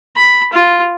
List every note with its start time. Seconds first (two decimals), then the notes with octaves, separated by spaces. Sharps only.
0.15 B5
0.52 F4